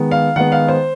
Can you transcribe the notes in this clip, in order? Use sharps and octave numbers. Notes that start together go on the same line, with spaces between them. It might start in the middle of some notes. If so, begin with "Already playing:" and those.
Already playing: D#3 G#3 B3
F5
D#3 G#3 B3 F#5
F5
C5